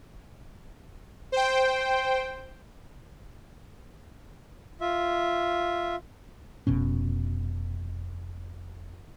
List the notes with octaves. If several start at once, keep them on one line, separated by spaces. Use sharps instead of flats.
C5 G5
F4 E5
F1 B2 C#4